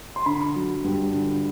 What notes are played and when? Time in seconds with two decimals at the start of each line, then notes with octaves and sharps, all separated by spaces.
0.16 C6
0.26 D3 B5
0.56 F#3
0.84 G2
1.14 D3